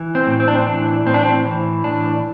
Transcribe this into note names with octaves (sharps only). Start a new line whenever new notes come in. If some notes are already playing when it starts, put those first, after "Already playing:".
Already playing: E3
C4
A2
C4
D4
C4
E3 D4
A2 C4
D4
C4
E3
A2 D4